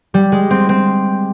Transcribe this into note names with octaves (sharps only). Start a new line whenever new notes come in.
G3
G#3
C4
C4